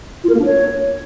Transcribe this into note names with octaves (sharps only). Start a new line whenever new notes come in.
F4
A#4
A#3
D4
C#5